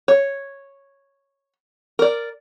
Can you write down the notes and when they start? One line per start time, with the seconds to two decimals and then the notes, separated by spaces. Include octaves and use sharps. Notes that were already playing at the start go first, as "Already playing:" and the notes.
0.08 C#5
1.99 A#4 D5